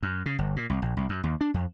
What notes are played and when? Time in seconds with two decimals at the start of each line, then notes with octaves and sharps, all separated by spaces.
0.03 F#2
0.26 C#3
0.39 G1
0.56 A#2
0.70 C2
0.82 A#1
0.97 C2
1.09 F#2
1.24 D#2
1.41 D4
1.54 F2